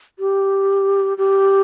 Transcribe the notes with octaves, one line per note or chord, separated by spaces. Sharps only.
G4
G4